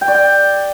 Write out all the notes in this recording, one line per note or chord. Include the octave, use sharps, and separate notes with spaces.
G5
D5
G5